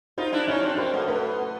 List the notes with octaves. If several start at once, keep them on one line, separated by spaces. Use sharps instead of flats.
D#4 F4 C5
D4 E4
C#4 D#4 C#5
C4 D4
A#3 C4 C5
A3 B3
A3 B3 B4